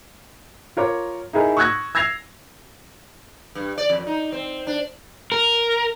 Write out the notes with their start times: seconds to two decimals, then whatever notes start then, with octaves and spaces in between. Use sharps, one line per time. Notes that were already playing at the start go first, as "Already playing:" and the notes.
0.77 F4 A#4 C#5 D6
1.33 D#4 E4 G#4 A#4
1.57 C#6 D#6 E6 F#6 G#6 A#6
1.95 E6 G#6 A#6 C7 F7
3.55 G2
3.78 D5
3.90 F2
4.07 D#4
4.32 C4
4.67 D4
5.32 A#4